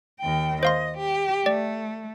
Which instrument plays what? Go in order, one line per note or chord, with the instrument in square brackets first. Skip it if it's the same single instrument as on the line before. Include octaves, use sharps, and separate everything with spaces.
[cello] D#2 G5
[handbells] C5 F5 C6 [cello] D#5
[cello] G4
[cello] A3 [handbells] D5